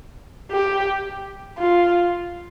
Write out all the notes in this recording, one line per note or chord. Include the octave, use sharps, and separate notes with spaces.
G4
F4